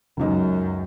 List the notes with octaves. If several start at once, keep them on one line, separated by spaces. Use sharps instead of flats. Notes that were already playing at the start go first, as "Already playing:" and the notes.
C#2 F#2 D#4